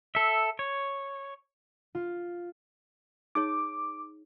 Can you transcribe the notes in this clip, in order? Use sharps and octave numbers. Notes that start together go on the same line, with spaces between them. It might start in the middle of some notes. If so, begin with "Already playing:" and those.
A4 E5
C#5
F4
D#4 G#4 C#5 D6